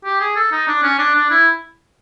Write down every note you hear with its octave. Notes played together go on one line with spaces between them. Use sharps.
G4
G#4
A4
D#4
D4
C#4
D4
D4
E4